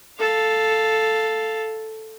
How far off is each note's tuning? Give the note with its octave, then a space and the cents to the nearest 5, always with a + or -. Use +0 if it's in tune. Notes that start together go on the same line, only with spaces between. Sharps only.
A4 +0 F5 +0